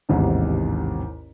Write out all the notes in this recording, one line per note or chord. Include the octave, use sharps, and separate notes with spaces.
A1 D#2 G#2 C3